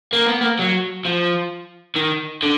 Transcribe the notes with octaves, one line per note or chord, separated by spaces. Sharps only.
A#3
B3
A#3
F#3
F3
D#3
D3